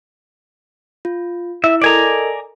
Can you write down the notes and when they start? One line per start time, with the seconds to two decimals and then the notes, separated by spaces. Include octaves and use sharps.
1.05 F4
1.64 E4 E5
1.82 A4 A#4 D5 D#5 G#5 A#5